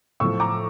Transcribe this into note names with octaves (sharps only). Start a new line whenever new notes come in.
A2 F3 C#6 E6
A#5 D6